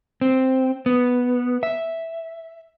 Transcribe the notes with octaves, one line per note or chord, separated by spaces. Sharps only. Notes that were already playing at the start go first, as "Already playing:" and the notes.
C4
B3
E5